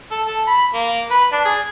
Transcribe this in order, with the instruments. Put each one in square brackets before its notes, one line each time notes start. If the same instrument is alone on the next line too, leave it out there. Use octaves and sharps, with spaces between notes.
[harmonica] A4
A4
B5
A#3
B4
D4
G#4